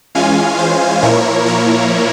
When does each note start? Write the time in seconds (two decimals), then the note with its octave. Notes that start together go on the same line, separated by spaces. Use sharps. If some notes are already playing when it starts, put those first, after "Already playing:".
0.15 E3 G#3 C#4 F4 F5 G#5
0.59 C5
1.02 A#2 F3 A#3 E4 A#4 C#5
1.46 A#4 C#5